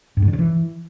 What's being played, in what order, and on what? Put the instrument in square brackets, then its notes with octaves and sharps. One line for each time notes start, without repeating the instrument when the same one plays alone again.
[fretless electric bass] G2
G#2
D3
C#3
E3